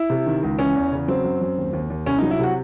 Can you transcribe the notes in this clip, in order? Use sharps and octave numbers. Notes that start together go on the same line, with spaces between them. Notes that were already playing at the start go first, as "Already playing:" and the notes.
Already playing: E4
C3
D#3
C#2
E3 C#4
E2
C#3
F#3 C4
F#2
F#2
D#2
D#2
D#2
C2 C#4
D#4
F#3
E4
C3 F#4